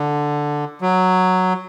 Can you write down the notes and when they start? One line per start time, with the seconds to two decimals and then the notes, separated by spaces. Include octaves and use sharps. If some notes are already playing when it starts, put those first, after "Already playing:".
Already playing: D3
0.81 F#3